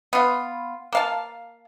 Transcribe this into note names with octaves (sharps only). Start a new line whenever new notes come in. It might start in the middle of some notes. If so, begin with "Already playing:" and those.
B3 F4
A#3 F5 A5